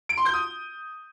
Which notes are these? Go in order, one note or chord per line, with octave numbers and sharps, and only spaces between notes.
D7
C6
G6
D#6